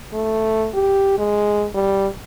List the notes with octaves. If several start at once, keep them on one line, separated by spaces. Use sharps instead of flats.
A3
G4
G#3
G3